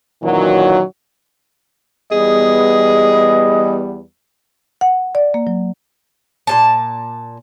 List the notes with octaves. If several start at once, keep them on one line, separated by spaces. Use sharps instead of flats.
F#2 A#2 D#3 E3 F#3
E2 G3 B3 G#4 D#5
F#5
D5
A#3
F#3
A#2 C#3 A5